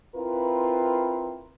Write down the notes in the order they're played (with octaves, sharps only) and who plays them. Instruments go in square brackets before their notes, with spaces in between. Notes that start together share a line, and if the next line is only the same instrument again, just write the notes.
[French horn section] C4 E4 F4 A#4 B4